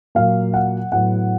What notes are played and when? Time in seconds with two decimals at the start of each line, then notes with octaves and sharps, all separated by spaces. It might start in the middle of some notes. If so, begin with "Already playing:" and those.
0.15 A#2 F#3 A#3 F5
0.54 F#5
0.92 A2 F#3 B3 F#5